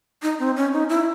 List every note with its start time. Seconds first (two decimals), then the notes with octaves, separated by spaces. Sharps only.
0.23 D#4
0.39 C4
0.56 C#4
0.73 D#4
0.89 E4